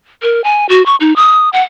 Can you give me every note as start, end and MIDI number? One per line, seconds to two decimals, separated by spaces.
0.23 0.43 70
0.44 0.66 80
0.69 0.84 66
0.86 0.96 85
1.00 1.13 63
1.16 1.49 87
1.53 1.62 78